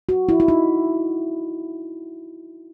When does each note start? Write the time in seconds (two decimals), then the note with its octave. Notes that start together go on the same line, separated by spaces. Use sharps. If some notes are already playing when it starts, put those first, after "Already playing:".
0.09 F#4
0.29 E4
0.40 E4
0.48 D#4